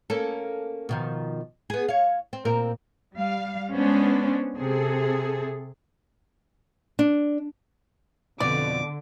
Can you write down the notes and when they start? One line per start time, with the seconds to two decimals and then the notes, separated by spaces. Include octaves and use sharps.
0.10 A#3 C#4 A4
0.89 B2 D#3 F3
1.70 B3 G#4
1.88 C#5 F5
2.33 C4
2.45 A#2 C4 A#4
3.14 G3 F5
3.74 G#3 B3 C#4 D4 C5
4.56 C3 G#4 A4
6.99 D4
8.40 F2 B2 D3 D5 D6